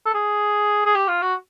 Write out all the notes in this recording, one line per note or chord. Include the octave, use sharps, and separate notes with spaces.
A4
G#4
G#4
G4
F4
F#4